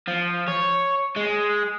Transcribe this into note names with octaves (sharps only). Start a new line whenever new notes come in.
F3
C#5
G#3